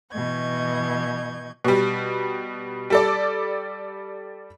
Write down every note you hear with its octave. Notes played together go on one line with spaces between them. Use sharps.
B2 E3 D#5 C#6 G6 G#6
B2 G3
G3 A4 D5